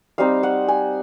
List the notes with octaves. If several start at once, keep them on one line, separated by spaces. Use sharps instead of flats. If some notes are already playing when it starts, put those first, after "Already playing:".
G3 C4 D#4 F5
F#5
G#5